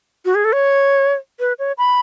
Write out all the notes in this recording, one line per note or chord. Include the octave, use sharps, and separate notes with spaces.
F#4
G#4
A4
C#5
B4
C#5
B5